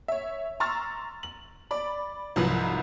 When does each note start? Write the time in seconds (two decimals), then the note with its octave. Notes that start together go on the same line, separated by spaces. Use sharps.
0.08 C#5 E5
0.60 A#5 C6 C#6 E6 F6 A6
1.23 F#7
1.71 D5 B5
2.36 C2 G#2 F3 F#3 B4 F#7